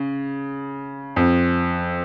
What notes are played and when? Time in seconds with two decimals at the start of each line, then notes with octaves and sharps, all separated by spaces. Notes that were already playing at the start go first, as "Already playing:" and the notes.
Already playing: C#3
1.16 F2